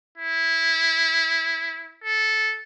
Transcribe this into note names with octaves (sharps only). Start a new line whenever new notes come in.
E4
A4